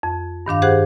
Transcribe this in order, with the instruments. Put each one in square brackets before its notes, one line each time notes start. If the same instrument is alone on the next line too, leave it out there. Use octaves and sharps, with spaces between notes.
[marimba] F2
G2 D#3 D4 F5
G4 G#4 C5 F#5 F#6